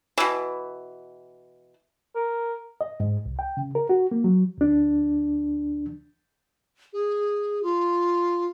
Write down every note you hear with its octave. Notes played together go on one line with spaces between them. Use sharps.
B2 E3
A#4
D#5
G#2
C2
G5
C#3
A#4
F#4
A#3
F#3
D2 D4
G#4
F4